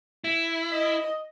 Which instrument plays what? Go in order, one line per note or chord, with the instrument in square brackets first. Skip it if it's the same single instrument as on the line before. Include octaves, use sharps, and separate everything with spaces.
[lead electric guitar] E4
[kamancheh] D#5